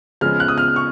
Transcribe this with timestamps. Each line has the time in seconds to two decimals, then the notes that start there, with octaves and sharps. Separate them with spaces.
0.21 C#3 F3 G#3 B3 F6
0.40 F#6
0.48 D#6
0.58 F6
0.76 C#6